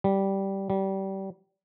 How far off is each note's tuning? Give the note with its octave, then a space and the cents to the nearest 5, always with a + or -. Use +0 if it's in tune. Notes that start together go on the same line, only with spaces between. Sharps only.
G3 -10
G3 -25